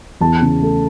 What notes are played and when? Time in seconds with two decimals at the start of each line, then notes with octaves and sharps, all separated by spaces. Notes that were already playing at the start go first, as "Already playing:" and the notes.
0.21 E2 A5
0.41 C#3
0.62 A3